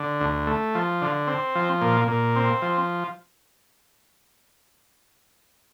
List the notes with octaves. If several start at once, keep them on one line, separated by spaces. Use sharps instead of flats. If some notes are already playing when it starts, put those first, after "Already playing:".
Already playing: D3
D2
A3
F3
D3
C4
F3
A#2
A#2
C4
F3